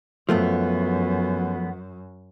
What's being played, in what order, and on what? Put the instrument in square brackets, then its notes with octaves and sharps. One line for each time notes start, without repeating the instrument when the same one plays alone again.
[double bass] F#2 [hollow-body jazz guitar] F3 A3 B3